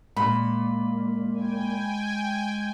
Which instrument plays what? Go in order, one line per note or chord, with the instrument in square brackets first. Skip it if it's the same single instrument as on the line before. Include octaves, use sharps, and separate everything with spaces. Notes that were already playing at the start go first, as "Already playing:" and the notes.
[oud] A#2 [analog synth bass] G#3 [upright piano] B5
[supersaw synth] G5 G#5